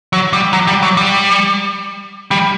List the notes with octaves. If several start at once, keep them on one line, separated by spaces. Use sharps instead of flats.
F#3
G3
F#3
G3
F#3
G3
G3